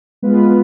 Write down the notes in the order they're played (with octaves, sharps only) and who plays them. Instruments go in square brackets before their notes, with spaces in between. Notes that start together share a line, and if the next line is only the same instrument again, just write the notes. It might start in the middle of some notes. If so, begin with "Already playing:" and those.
[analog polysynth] G#3 B3 F4 B4